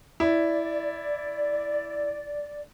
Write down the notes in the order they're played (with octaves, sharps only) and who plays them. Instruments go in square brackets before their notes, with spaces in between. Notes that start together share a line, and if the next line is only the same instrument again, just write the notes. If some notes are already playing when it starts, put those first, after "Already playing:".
[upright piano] E4 [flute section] D5